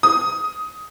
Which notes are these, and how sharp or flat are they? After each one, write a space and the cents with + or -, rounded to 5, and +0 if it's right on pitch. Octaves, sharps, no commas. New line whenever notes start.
D#6 +10